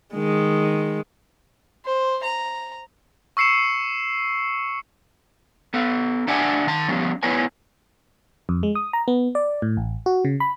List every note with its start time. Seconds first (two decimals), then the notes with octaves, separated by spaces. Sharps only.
0.14 D#3 G#3
1.85 C5
2.23 A#5
3.37 C#6 E6 C7 C#7 E7
5.74 B3 A4
6.28 D4 D5 E5 F#5 G#5 A5
6.67 D#3 A5
6.88 F3 G3 B3 C#4
7.23 B3 E4 B4 C#5 G#5
8.49 F2
8.63 G#3
8.75 D#6
8.93 A#5
9.08 B3
9.35 D5
9.62 A2
9.77 A1
10.06 F#4
10.25 C#3
10.40 B5